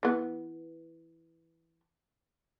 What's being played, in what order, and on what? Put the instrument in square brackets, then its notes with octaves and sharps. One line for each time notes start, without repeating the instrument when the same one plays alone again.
[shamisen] E3 B3